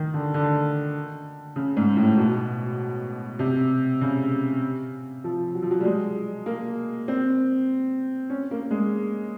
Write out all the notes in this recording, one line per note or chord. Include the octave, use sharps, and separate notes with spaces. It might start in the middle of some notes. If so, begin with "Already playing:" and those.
Already playing: D#3
D3
D3
C#3
G#2
A2
B2
C3
C#3
F3
F#3
F3
F#3
G3
G#3
A#3
C4
C#4
A#3
G#3